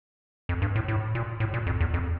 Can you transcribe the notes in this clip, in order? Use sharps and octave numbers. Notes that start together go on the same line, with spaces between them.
F2
G2
A2
A2
A#2
A2
A#2
F2
E2
F2